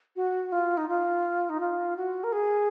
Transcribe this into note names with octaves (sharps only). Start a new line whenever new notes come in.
F#4
F4
D#4
F4
D#4
F4
F#4
A#4
G#4